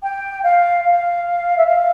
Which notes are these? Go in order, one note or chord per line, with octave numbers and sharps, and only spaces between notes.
G5
F5
F5
E5
F5